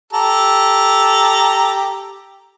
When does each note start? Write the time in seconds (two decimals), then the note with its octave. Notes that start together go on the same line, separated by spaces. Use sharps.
0.13 G4 A4 A#5